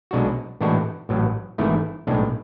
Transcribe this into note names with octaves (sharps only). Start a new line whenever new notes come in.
B1 B2 G#3 D4 F#4
A2 E3 G#3 D4 F#4
A1 A2 F#3
G#1 G#2 E3 A3 E4
B1 A2 G#3 D4